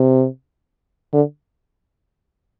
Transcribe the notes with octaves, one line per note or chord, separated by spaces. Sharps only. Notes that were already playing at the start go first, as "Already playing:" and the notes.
Already playing: C3
D3